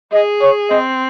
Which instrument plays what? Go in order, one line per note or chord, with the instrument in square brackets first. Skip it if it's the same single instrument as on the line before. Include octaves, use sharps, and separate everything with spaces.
[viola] G#4 [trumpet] D#5
[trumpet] C#5
[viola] C4 [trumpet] D#5